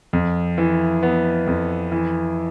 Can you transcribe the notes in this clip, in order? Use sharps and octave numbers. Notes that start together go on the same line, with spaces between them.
F2
E3
B3
F2
E3